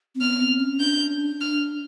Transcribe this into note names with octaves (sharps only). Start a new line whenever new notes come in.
C4
B3 F6
C4
C#4
D4 G6
F6